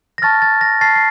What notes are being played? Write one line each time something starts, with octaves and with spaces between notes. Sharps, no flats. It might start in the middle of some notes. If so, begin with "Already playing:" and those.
A#6
A5 C#6 F6 A6
A6
A#6
A5 C#6 F6 A6 C7
C7